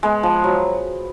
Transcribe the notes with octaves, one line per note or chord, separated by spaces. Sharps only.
G#3 B3
F3
F#3